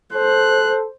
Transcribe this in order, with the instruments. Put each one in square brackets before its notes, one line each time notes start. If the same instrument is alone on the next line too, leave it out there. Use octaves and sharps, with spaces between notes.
[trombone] A4 [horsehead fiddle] C5 [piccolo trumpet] F#6